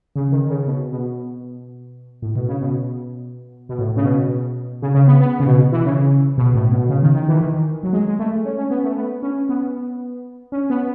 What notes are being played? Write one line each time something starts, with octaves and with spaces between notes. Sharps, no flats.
C#3
D#3
C#3
B2
B2
A2
B2
C#3
B2
B2
A2
C#3
B2
C#3
C#3
B3
B3
C#3
B2
E3
C#3
B2
A2
B2
C#3
D#3
D#3
E3
D#3
F#3
G#3
G#3
A3
C#4
C#4
B3
A3
B3
C#4
B3
C#4
B3